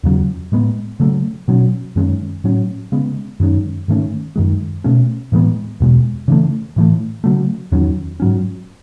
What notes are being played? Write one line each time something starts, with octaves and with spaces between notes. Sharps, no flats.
E2 C#3 F#3
A2 G#3 B3
C#3 F#3 A3
B2 F#3 C#4
F#2 D#3 G#3 C#4
A2 F#3 C#4
C#3 G#3 B3
F#2 D#3 G#3 C#4
G#2 D#3 A3 C#4
F#2 D#3 G#3
B2 A3 C#4
A2 E3 G#3 B3
E2 B2 G#3
C#3 E3 A3
A2 E3 A3
C#3 F#3 A3
E2 D#3 F#3 C#4
G#2 F#3 C#4